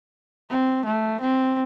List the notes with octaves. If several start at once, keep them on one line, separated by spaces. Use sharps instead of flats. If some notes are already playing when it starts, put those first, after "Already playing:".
C4
A3
C4